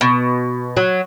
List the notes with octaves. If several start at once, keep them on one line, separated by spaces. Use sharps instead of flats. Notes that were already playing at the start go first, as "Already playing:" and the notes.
B2
F#3